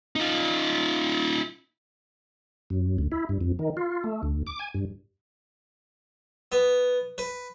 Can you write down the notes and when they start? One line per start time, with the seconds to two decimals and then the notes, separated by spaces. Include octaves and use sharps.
0.16 D#4 F4
2.70 F#2
2.98 D2
3.12 E4
3.29 G2
3.41 F2
3.59 D#3
3.77 F4
4.04 A3
4.23 D2
4.47 D6
4.59 G#5
4.74 G2
6.52 B3
7.18 B4